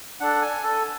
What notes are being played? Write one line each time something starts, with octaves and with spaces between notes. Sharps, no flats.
D4 A4 F#5
G#5
A4